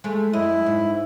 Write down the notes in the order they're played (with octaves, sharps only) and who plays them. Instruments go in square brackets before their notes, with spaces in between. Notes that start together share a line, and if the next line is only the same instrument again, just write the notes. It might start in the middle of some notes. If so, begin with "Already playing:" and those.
[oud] G#3 A3
[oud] F#2 D#5 [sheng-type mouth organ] E4
[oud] G#2